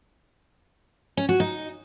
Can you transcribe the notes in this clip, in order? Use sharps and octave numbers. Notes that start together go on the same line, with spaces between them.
C#4
F#4
D#4